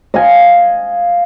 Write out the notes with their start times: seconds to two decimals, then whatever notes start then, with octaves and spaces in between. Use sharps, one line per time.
0.14 D#5 F5 G#5